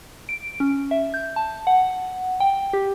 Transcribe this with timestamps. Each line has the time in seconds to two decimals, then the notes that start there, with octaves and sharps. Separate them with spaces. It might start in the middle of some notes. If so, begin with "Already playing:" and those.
0.29 D7
0.60 C#4
0.91 E5
1.14 G6
1.36 A5
1.67 F#5
2.40 G5
2.73 G4